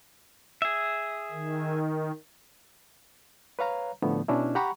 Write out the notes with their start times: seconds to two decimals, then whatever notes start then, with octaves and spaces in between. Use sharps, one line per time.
0.62 G#4 E5
1.32 D#3
3.59 B4 C#5 F5 A#5
4.02 A2 D3 F3 A3 B3
4.28 B2 C#4 D4 E4
4.55 G4 F#5 A#5 B5 C#6